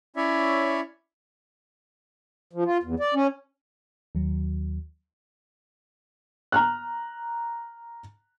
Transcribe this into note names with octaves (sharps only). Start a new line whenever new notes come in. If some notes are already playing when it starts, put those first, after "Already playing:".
C#4 E4 C#5 D5 E5
F3
F4
E2
D5
C#4
D#2 F#3
A#5 F6 F#6